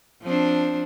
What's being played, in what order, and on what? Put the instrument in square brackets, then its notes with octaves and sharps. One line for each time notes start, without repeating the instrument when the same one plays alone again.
[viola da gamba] F3 C4 D4